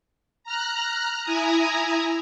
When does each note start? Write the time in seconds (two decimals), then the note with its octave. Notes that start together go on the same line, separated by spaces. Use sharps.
0.44 A#5 F6 F#6
1.23 E4 G#5 A#5 D#6